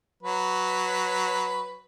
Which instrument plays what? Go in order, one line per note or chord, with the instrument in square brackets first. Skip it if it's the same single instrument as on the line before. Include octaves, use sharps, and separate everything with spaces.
[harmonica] F#3 B4